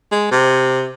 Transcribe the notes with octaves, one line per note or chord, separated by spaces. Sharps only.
G#3
C3